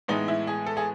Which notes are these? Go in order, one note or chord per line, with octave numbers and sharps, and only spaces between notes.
A2 E3 G#3 B3 D#4
E4
G#4
A4
G#4